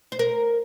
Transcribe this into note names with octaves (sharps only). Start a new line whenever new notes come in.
C5
A#4